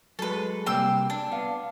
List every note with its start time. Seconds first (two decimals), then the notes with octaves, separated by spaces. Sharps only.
0.19 F#3 G#3 A4 B4
0.66 C3 G3 A#3 G5 C6 E6
1.10 D4
1.31 B3 F5